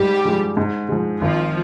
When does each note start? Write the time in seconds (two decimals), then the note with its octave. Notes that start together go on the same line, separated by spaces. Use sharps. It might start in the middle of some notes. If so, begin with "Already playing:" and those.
Already playing: G#2 G3 G4
0.25 F3 G#3
0.57 G#2
0.89 F3 G#3
1.21 G#1 F3 F4